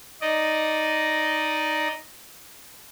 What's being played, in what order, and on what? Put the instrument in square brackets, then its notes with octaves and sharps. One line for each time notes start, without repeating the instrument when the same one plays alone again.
[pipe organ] D#4 D5 D#5